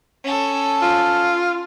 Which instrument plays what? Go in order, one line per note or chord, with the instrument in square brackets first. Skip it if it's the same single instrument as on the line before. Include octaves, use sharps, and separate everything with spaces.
[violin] C#4 A4
[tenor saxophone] F4